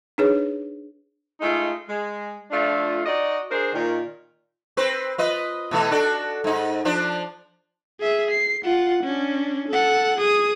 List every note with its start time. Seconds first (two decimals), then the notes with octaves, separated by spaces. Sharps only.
0.18 D4 D#4 G#4 B4 C#5
1.41 G#3 A3 D#4 F4
1.88 G#3
2.51 F3 A3 D4 F4
3.06 D#4 F#4 D5 D#5
3.51 D4 G#4 A#4 C5
3.73 A#2 D#3
4.77 C4 B4 C5
5.18 F4 B4 D#5
5.71 B2 E3 A3
5.91 D4 F#4 A4
6.44 G#2 D#4
6.85 F3 D4 C5
8.00 G#4 E5
8.31 C7
8.65 F4 F#5
9.04 C#4 D4
9.68 A4 F#5
10.18 G#4 D#6